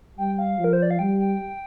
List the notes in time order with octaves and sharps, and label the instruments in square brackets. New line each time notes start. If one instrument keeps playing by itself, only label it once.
[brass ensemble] G3 [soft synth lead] G5
[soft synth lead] F5
[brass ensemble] F3
[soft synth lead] A#4
C5
D5
F5
[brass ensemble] G3 [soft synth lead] G5
[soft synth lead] G5